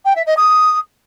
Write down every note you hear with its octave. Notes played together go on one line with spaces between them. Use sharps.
G5
E5
D#5
D#6